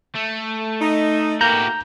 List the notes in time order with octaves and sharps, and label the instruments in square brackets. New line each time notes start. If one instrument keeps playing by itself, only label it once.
[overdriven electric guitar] A3
[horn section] D#4
[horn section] B2 A3 A#3 [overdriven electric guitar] F#4 G4 [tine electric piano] A#5 G6